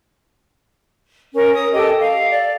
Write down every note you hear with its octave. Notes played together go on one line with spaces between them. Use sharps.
C#4 A#4
D#6
G4 A4 D#5
F5
D5